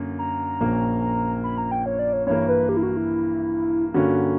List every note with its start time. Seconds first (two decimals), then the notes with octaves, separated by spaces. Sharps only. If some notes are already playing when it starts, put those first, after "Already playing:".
Already playing: F#2 D3 A#3
0.19 A#5
0.60 A#1 A#2 A#3 C#4
1.44 B5
1.58 A#5
1.71 G5
1.86 C#5
1.99 D5
2.13 C#5
2.27 G2 E3 A#3 C#5
2.48 B4
2.69 G4
2.77 E4
2.83 F#4
2.97 E4
3.94 G2 D3 A#3 C#4 F#4